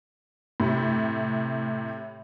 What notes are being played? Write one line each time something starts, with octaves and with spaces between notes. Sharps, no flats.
A2 C3